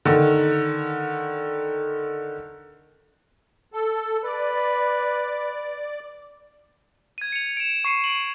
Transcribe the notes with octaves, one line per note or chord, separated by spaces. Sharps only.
D3 D#3
A4
B4 D5
G#6 D#7
C#7 F7
D7 E7
C#6 C7 C#7 D#7
D7 F#7